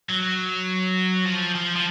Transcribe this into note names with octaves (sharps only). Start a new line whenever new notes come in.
F#3
F3
F3
F3